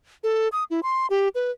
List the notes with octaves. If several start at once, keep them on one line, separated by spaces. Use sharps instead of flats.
A4
D#6
E4
C6
G4
B4